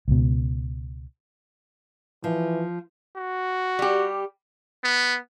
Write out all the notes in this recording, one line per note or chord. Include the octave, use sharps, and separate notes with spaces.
C#2 B2
E3 F3
F#4
G3 G4
B3